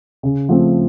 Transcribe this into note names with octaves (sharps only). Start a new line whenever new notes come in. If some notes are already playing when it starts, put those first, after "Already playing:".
C#3
F3 A3 C4